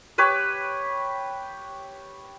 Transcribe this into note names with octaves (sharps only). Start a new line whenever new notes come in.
G4 B4 C#5